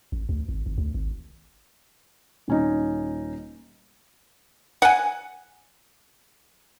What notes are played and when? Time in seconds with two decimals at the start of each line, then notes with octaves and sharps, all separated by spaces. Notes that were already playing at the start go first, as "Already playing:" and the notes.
0.12 A1
0.29 D2
0.49 G#1
0.66 G#1
0.78 D2
0.95 G#1
2.48 D#1 C#4 D#4
4.82 F#5 G#5